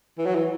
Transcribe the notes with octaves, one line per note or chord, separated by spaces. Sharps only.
E3
F#3
E3